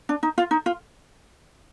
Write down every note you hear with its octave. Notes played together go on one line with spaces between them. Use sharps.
D4
D#4
F4
D#4
F4